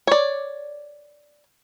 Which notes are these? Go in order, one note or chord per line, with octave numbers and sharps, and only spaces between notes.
C#5 D5